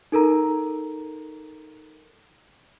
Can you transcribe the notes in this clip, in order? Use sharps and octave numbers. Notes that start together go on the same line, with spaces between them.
D#4 A4 A#4 A#5